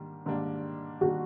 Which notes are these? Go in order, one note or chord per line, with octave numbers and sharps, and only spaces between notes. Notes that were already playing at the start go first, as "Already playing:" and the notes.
Already playing: G#2 D#3 G3 A#3 D4
G#2 D#3 G3 A#3 D4
D#3 G3 A#3 D4 F#4